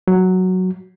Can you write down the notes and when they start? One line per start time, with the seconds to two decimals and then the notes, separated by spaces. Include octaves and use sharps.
0.08 F#3